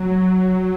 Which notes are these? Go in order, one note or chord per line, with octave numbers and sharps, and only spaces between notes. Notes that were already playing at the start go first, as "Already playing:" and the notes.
Already playing: F#3
F#3